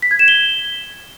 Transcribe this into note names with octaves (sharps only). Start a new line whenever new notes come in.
B6
G#6
E7
G7